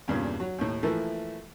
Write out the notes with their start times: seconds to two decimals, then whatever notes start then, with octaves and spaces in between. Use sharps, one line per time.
0.08 E2 G2 A#2 C#3
0.40 F#3
0.58 D#2 A2
0.83 E3 F3 A3 A#3 E4